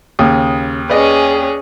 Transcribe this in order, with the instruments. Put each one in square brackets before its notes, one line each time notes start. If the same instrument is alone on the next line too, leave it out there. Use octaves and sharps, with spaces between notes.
[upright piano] D#2 [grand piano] C#3 D#6
[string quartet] C#4 G#4 [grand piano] B4 D5 D#5